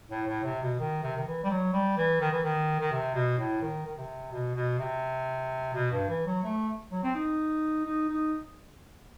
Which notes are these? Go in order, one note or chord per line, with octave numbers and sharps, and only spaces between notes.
A2
A2
C3
B2
D#3
C3
D#3
E3
G3
F#3
G3
E3
D#3
E3
D#3
D#3
C3
B2
A2
D#3
D#3
C3
B2
B2
C3
B2
G2
E3
F#3
A3
F#3
C4
D#4
D#4
D#4